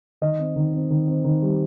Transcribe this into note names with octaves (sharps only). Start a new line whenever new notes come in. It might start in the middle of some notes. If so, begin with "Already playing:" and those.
D#3 D#5
C4
D#3
C4
D#3
C4
D#3
G3